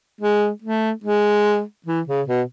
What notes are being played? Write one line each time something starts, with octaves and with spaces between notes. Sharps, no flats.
G#3
A3
G#3
E3
C#3
B2